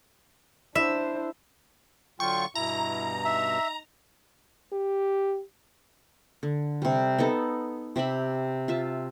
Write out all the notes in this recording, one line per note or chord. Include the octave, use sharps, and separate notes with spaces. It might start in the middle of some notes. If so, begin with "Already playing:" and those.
D4 E4 C5 E5
D3 F#3 F4 G5 C#6
G2 B2 E4 A#5
D#4 E5
G4
D3
C3 G3
B3 D#4 A4
C3 G4 E5 B5
F4 E5 A5